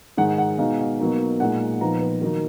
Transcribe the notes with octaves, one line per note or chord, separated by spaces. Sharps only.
G#2 D#3 G#3 D#4 F#5
F#5
B2 G#3 D#4 F5
F5
B2 F#3 A#3 D#4
A#2 G#3 D#4 F#5
A#2 F3 B3 D#4 A#5
B4
D#3 F#3 A#3 D#4 A#4